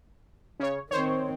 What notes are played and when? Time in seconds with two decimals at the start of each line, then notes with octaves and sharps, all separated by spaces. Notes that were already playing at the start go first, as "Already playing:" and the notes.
0.60 C#3 C#5
0.91 D#3 C4 C5 C#5